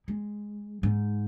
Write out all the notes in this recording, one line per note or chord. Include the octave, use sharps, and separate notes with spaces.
G#3
G#2